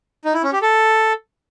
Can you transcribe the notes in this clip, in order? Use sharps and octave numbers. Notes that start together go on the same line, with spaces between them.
D#4
E4
C#4
G4
A4